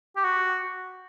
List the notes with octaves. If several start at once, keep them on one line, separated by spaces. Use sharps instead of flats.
G4
F#4